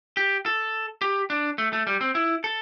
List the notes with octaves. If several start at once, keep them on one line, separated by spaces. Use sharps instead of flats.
G4
A4
G4
D4
A3
A3
G3
C4
E4
A4